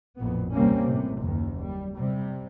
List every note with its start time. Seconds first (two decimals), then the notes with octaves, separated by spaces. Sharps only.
0.19 A1 F2 A#2 B3
0.53 D#2 C3 G3 A#3 C4 C#4
0.83 A2 C3
1.22 F#1 D#2 D#3
1.59 G3
1.95 C3 G3